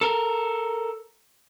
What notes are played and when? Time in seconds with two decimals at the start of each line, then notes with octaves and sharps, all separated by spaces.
0.01 A4 A#4